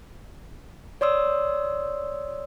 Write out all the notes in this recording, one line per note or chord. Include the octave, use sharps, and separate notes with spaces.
C#5 D5 C6 D#6 E6